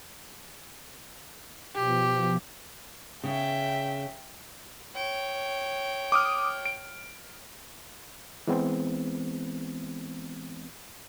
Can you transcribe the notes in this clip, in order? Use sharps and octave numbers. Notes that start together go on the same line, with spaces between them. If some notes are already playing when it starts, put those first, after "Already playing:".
B2 F3 G4
C#3 E5 G5
C#5 G5
D6 D#6 F6
D7
E3 G#3 B3 C4